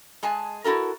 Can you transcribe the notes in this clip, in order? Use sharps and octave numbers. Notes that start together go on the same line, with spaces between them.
G#3 G#4 G#5 A5
E4 F#4 A4 A#4